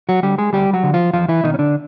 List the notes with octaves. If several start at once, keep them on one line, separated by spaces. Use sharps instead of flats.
F#3 F#4
D3 G3 G4
G#3 G#4
D2 G3 G4
F#3 F#4
D3
F3 F4
E2 F3 F4
E3 E4
B2 D#3 D#4
C#4
D3 D4